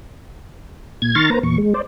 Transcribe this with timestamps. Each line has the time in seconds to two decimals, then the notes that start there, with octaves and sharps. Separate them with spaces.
1.02 A#2 G#6
1.15 D#3 A#5 C6 C#6 F6 A6
1.30 A#3 B4 C5 A#5
1.43 E2 A#2 C#6
1.58 G#3
1.74 C5 D5